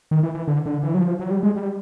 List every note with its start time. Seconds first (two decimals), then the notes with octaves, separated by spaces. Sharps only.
0.11 D#3
0.23 E3
0.35 E3
0.48 D3
0.66 D3
0.83 E3
0.95 F#3
1.01 F3
1.20 F#3
1.31 G3
1.43 G#3
1.56 G3